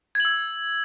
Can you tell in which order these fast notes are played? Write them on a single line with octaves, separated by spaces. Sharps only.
G#6 F#7 E6